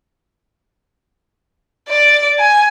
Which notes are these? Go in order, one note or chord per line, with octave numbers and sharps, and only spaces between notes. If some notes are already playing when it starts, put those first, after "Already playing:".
D5
G#5